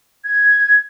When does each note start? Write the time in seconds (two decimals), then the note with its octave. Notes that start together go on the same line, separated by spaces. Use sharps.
0.24 G#6